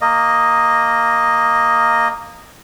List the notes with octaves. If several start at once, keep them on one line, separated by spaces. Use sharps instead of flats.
A#3 D#5